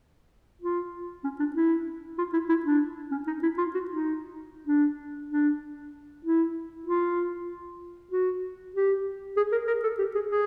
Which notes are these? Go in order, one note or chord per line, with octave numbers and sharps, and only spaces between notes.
F4
C#4
D4
E4
F4
E4
E4
D4
C#4
D#4
E4
F4
F#4
D#4
D4
D4
E4
F4
F#4
G4
G#4
A#4
A#4
A4
G4
G#4
G#4